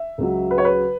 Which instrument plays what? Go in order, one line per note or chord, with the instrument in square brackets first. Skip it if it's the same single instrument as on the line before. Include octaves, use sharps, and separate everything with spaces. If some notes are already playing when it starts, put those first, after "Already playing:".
Already playing: [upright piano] E5
C#2 C#3 F#3
B4
C#5
B4